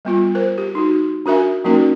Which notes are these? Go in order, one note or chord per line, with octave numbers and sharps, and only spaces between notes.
G3 B3 F4
A#4 C5
G4
D#4 F#4
D4 F#4 A#4 E5 G#5
F#3 A#3 C#4 D#4 F#4 A#4